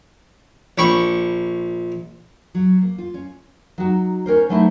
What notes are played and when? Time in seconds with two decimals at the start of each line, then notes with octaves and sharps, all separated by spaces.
0.78 A#1 B5 C#6
2.54 F#3
2.81 A#3
2.98 F4
3.14 C#4
3.78 F#3 D#4 F#4
4.26 C#4 A#4 C5
4.49 F#3 A3 D#4 E4 C5 E5